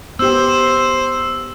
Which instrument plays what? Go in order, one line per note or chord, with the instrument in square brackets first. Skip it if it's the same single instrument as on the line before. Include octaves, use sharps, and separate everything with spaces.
[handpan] B3 G4 [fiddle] C5 [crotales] E6